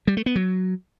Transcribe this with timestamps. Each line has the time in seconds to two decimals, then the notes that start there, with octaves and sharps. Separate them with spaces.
0.07 G3
0.17 A3
0.26 B3
0.36 F#3